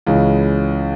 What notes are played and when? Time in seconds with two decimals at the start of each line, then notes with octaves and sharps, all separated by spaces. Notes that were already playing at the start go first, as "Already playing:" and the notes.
0.06 C#2 C#3 E3 G#3 C#4